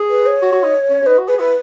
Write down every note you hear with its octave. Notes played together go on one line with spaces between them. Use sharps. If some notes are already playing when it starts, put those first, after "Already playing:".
Already playing: G#4
B4
C#5
F#4
F#4
D#4
C#4
C#4
D#4 B4
F#4
G#4 B4
E4 B4